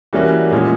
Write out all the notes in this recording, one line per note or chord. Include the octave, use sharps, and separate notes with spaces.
E3 G3 A#3 C#4 F#4
A#2 F3 G#3 C#4